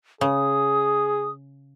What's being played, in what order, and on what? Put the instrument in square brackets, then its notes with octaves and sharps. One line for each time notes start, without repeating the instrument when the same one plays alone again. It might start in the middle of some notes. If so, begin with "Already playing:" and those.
[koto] C#3 [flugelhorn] G#4 [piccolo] D#6